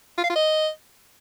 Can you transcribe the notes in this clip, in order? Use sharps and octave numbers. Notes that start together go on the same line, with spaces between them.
F4
F5
F4
D#5